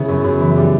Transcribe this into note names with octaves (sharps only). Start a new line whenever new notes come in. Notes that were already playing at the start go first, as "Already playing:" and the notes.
Already playing: C#3 B3 C#4 E4
F#2
F#2
E3
G3